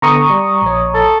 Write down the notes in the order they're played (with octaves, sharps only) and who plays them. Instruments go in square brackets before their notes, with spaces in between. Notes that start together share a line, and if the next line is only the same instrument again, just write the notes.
[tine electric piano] D3 B3 [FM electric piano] A#5 C#6 D#6
[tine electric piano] G3
A#1 C#5
[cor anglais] A4